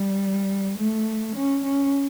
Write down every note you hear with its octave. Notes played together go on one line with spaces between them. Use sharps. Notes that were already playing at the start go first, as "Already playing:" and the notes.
Already playing: G3
A3
C#4
C#4